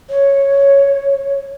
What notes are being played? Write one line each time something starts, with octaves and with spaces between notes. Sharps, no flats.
C#5